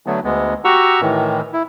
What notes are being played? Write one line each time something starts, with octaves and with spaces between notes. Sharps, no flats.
D3 F#3 A3 B3
D2 G#3 B3
F#4 G4 F#5 A#5 C#6 E6
A2 D#3 E3
E4